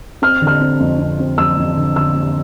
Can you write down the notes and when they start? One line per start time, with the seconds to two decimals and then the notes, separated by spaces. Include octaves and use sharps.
0.22 C4 F6
0.42 D3
0.47 F6
0.61 C4
0.80 F2
0.99 C4
1.20 C4
1.38 F2 E6
1.57 F2
1.77 D3
1.96 D3 E6
2.15 C4